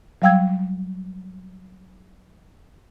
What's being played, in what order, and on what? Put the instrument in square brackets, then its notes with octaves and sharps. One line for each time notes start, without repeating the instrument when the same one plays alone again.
[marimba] F#3 G3 F5 G5 E6 G#6